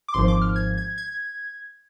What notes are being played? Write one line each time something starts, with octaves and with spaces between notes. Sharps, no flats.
D6
G#1 G#2 F3 C6
D6
F6
G#6
G#6
G#6